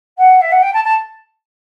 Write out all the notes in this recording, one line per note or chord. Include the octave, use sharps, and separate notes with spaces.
F#5
E5
F#5
G5
A5
A5